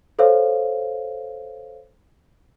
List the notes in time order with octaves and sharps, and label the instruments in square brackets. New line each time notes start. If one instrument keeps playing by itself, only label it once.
[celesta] A4 C5 C#5 F5